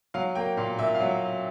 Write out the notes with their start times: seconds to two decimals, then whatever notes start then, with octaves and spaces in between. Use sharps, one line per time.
0.14 F#3 F5
0.35 A#3 G5
0.57 A#2 F5
0.78 A#2 E5
0.95 F5
1.00 F#3